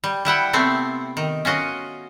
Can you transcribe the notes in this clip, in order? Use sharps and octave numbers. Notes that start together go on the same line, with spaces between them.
G3
G3 E4 F#5 G5
C3 A3 B3 C4
D#3
C#4 F4 F#4 D#5